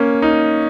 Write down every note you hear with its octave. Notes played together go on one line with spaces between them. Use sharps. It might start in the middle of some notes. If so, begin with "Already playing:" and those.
Already playing: A#3 C#4
D#4